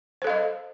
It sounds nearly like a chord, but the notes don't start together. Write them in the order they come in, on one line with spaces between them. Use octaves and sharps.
C5 A4 F5 D#5